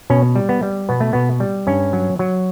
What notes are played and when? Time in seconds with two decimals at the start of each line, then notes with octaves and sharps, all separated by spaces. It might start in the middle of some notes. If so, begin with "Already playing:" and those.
0.10 B2 C#4
0.36 G3
0.49 B3
0.63 G3
0.89 B2 B3
1.00 A3
1.13 B2 B3
1.40 G3
1.67 G2 C#4
1.93 F#3
2.19 F#3